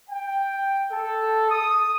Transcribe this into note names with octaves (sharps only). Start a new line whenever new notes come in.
G5
A4
D#6